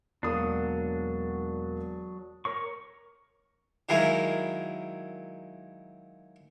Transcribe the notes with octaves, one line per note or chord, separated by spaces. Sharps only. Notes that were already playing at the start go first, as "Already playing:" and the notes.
E1 F#3 A#3 D4 D#6
A#4 C#5 C#6
D#3 F#3 G#3 A#3 E4